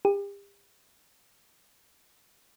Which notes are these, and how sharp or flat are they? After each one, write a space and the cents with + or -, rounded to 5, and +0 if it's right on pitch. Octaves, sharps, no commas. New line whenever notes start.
G4 +40